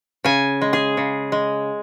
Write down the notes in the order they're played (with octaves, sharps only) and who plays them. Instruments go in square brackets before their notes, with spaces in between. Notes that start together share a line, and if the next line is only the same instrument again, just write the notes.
[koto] C#3 G#5
G#3
G#4
C#3
G#3